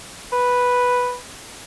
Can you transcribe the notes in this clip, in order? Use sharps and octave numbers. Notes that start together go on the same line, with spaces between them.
B4